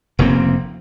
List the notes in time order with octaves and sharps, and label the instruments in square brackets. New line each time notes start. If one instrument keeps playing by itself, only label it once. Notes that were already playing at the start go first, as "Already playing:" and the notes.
[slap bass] F1 C#3 A#3 C4